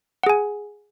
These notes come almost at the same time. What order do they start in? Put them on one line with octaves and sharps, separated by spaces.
F#5 G#4 G#5